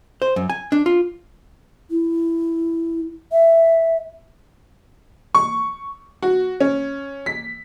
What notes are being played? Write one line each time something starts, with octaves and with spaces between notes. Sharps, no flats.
C5
F#2
G#5
D4
F4
E4
E5
C#6
F#4
C#4
B6